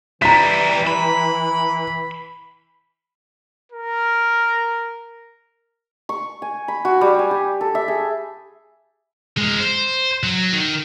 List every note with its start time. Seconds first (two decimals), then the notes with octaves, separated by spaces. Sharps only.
0.22 E3 G3 E4 A#5 B6
0.87 B5
3.72 A#4
6.09 C#6
6.42 G#5
6.68 B5
6.85 F#4
7.01 G3
7.19 G#5
7.31 G4
7.61 A4
7.75 E5
7.88 G#4
9.37 G#3 A#4
9.60 C5
10.23 F#3
10.53 D#3